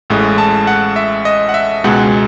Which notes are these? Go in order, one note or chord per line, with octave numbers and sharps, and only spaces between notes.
A1 A2 G#3
A5
F#5
E5
D#5
F#5
E5
C#2 B2 G#3 F#5